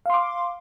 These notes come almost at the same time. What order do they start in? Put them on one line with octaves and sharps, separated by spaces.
F5 C6 D6